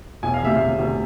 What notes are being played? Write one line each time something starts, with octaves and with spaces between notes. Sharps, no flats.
E1 G#5
F5
D2 C3 E5
E1 F5
D2 C3